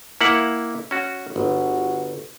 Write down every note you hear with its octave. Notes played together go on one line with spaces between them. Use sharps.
A#3 E4 F#5
C#4 F#4
G1 F#4